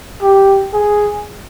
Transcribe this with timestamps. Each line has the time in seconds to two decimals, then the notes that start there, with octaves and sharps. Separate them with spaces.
0.22 G4
0.74 G#4